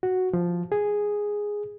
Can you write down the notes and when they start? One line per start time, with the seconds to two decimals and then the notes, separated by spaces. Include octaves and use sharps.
0.03 F#4
0.33 F3
0.72 G#4